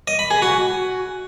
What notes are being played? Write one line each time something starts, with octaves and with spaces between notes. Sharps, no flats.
D#5
B5
G#4
F#4